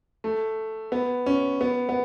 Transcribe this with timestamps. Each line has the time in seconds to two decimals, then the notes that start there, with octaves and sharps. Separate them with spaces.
0.24 A3
0.92 B3
1.26 C#4
1.61 B3
1.89 B3